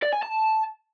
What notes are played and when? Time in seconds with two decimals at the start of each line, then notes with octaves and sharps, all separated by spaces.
0.03 D5
0.13 G#5
0.23 A5